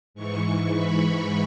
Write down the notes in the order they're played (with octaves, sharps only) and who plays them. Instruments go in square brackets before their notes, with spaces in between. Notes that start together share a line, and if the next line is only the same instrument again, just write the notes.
[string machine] G#2 E3 C#6
B5